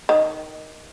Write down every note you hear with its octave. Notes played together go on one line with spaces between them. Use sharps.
D#3